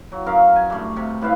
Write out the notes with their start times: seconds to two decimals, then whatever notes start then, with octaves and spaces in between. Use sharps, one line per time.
0.12 F#3
0.26 F#2 A#4 F5
0.56 G#5
0.70 G2 A3
0.96 C3
1.21 A2 B4 E5 F5